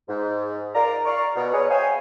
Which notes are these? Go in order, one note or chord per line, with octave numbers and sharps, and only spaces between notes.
G#2
F4 A#4 D5 A#5
D5 F5 A#5 C#6
B2
G#4 B4 C#5
C5 C#5 E5 F5 G5 G#5